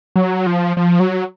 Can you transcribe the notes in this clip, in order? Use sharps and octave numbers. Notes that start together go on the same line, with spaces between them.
F#3
F3
F3
F#3